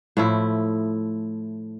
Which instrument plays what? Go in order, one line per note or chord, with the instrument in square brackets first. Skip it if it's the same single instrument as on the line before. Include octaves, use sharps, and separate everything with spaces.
[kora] A2 F3 A3 E4